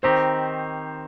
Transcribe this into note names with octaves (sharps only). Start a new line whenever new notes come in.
D#3 C4 D#4 G4 C5